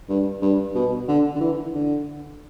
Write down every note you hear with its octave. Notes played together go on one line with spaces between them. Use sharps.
G2
G2
B2
D3
D3
E3
D3